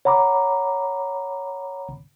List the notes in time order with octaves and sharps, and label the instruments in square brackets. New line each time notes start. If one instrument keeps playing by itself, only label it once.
[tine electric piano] C#5 F#5 A#5 B5 D6